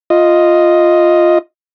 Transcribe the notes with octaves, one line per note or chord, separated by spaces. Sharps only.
F4 D#5